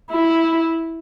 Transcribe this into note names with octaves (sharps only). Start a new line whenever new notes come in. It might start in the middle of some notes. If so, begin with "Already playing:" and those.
E4